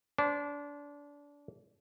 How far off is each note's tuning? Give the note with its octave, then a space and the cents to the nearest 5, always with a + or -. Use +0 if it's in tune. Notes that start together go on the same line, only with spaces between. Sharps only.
D4 -25 C5 +0